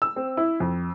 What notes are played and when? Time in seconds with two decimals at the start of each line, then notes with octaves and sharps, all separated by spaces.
0.02 E6
0.16 C4
0.37 E4
0.60 F2